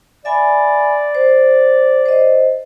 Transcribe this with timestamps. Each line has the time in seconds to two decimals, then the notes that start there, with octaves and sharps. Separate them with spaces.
0.25 D5 E5 G#5 B5
1.15 C5
2.06 C5 D#5